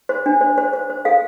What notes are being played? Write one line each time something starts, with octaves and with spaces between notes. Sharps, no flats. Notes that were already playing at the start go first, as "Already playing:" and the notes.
C5
D4
C5
C5
C5
C5
A4 F5